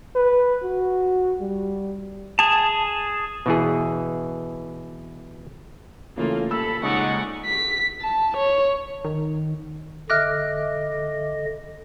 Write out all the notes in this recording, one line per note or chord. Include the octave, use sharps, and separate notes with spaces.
B4
F#4
G3
G#4 A5
B2 E3 G#4
C#3 E3 A3 A#3 F4
D#1 A4 B5 E6
C#3 G#3 D#4 D5 F#5 C#6
B6
A5
C#5
D#3
D3 D#5 E5 D6 F6 F#6 A#6